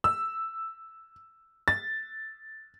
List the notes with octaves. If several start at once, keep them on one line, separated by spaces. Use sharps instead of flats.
E6
A6